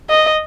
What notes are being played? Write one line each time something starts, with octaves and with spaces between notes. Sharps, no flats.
D#5